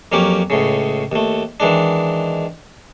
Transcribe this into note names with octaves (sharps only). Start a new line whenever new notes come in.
F2 F#3 A#3 C#4 G4 D6
C#2 A2 C#3
D#2 A3
D#3 E3 G#3 D4